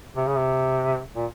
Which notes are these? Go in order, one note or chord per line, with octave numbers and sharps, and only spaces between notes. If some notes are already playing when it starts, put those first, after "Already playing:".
C3
C#3
C3
A#2